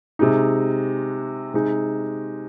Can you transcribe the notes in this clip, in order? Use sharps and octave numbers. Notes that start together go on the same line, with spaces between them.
C3 G#3 D#4
C3 G#3 D#4